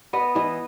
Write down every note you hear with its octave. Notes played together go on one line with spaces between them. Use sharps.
B3 D#5
E3 D#5